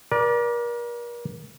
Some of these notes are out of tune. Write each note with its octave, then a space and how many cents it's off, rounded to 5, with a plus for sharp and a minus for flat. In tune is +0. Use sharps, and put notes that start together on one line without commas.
A#4 +40 D5 -5